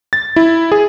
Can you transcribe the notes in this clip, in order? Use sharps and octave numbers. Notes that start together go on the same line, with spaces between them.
A6
E4
G#4